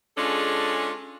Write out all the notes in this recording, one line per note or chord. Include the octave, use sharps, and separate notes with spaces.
G#3 C#4 D4 F4 G#4 A4